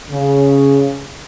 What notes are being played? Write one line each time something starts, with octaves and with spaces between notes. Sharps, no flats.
C#3